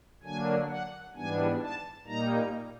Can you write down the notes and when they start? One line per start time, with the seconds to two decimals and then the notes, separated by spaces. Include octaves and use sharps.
0.23 D3 F#3 A#3 D4 G#5
0.69 F#5
1.15 G#2 E3 G3 B3 D4 G#5
1.62 A5
2.07 A#2 G3 A#3 D#4 A#5